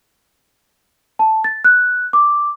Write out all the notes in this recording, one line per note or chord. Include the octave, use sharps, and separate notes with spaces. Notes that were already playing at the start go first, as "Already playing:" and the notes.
A5
A6
F#6
D6